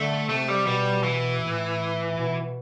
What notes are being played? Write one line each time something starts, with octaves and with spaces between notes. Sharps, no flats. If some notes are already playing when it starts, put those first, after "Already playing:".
Already playing: D3 A3
C3 A3
G3
B2 G3
E3
A2
B2